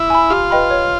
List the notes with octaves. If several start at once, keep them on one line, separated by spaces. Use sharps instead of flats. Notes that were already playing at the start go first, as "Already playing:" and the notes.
Already playing: E4
G#5 B5
F4 G4
B4 D#5 G5 B5
C#5